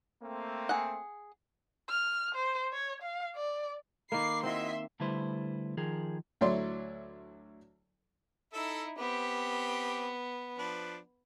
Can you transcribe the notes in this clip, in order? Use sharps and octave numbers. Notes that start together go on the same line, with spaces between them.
A3 A#3 C4
G#4 F#5
F6
C5
C#5
F5
D5
D#3 A#3 B5 C#6 D6 C7
C4 E4 F#4 D#5 E5 C6
D3 G3 A3 E4 B4 C5
D#3 F3 G#4 A#4
D2 F#3 E4 C#5 D5 C6
D#4 E4 A4 E5
B3 C4 G4
F3 D4 B4